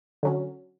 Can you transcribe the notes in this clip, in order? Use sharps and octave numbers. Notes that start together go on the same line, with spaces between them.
D3 F#3 C#4